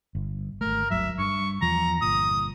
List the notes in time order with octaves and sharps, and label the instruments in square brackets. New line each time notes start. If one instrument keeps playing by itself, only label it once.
[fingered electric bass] G1
[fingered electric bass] G#1 A3 [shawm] A#4
[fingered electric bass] G1 D2 F#3 [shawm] E5
[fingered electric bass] G2 [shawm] C#6
[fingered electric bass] E2 F3 [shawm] A#5
[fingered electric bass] G1 A#2 [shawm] D#6